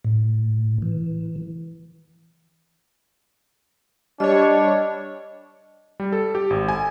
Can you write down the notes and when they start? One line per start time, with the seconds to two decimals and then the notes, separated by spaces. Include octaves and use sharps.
0.04 A2
0.82 E3
4.20 G3 D4 C#5 D#5
6.00 G3
6.12 A4
6.35 G4
6.50 G#1
6.68 G#5